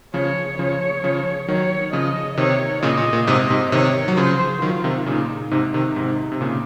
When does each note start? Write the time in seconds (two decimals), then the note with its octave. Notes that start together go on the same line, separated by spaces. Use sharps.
0.14 C#3 F3 C#5
0.59 C#3 F3 C#5
1.04 C#3 F3
1.48 D#3 F#3 C#5
1.93 C#3 F3 D#5
2.37 C3 D#3 C#5
2.82 A#2 C#3 D#5
2.97 A#2
3.13 A#2
3.27 G#2 C3 D#5
3.50 G#2 C3
3.72 C3 D#3 C#5
4.08 F#3
4.17 C#3 F3 C5
4.62 D#3 F#3 F4
4.84 C3 D#3
5.06 A#2 C#3 D#4
5.51 G#2 C3 D#4
5.74 C3 D#3
5.96 G#2 C3
6.32 C3
6.41 A#2 C#3